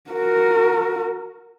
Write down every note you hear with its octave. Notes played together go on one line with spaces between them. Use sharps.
F#4 A#4